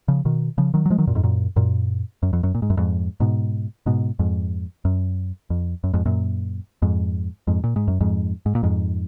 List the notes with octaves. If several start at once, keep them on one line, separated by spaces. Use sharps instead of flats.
C#3 F3
B2 D#3
C#3 F3
D#3 F#3
F#3
F3 G#3
D#3 F#3
F#2 A#2
F2 G#2
F#2 A#2
F#2 A#2
F#2
F2
F#2
A#2
G#2
F#2
F2 G#2
G#2 B2
G#2 B2
F2 G#2
F#2
F2
F#2
F2 G#2
F#2 A#2
F2 G#2
F2 G#2
A#2
G#2
F#2
F2 G#2
G#2
A#2
F2 G#2